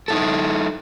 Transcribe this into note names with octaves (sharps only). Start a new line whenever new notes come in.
D#4 E4 A4